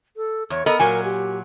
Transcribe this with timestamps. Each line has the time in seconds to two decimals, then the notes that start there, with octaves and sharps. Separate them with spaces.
0.17 A4
0.50 E2 C#5
0.66 B3 A4 A#4 D#5
0.79 A#2 F#3 A#4 G#5
1.04 G4